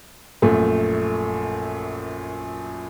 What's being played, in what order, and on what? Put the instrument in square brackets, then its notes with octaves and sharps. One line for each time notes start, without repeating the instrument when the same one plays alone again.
[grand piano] A#1 F#2 A3